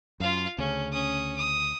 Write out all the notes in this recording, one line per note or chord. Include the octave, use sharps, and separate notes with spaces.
F#2 F4 F5
D2 C#3 C#4
C#4 D#6
D#6